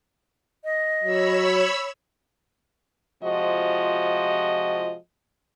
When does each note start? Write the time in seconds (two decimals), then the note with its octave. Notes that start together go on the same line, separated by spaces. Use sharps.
0.64 D#5
1.04 F#3 C#5 B5 E6
3.23 C3 F3 G#3 F4 F#4 D#5